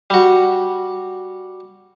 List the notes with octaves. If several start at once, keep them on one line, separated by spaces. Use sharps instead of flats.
G3 F#4